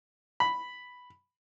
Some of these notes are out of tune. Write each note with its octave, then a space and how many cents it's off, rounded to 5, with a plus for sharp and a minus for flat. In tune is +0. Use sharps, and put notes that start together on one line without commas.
B5 +0